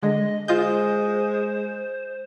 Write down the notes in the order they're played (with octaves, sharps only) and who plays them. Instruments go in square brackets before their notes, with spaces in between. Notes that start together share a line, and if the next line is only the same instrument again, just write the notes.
[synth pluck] D3 G#3 [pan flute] D#5
[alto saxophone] G#3 [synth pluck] F4 D#5 G6 [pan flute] C5